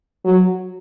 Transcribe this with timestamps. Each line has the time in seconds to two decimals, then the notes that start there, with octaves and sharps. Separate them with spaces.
0.25 F#3